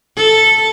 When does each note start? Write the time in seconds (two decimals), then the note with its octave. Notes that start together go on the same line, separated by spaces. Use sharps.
0.17 A4